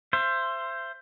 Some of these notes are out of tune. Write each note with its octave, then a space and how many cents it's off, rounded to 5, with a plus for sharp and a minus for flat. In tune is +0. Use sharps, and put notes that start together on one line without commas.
C5 +5 E5 +35